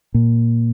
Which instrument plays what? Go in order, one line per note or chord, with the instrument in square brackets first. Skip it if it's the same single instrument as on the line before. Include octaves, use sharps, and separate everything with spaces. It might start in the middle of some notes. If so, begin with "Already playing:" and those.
[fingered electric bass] A#2